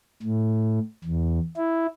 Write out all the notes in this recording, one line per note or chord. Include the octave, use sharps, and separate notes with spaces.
A2
E2
E4